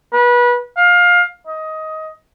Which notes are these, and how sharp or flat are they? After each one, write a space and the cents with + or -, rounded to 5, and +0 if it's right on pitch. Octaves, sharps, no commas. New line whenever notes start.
B4 -25
F5 +20
D#5 +15